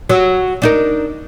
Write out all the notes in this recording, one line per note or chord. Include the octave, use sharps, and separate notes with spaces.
F#3
D4 D#4 A#4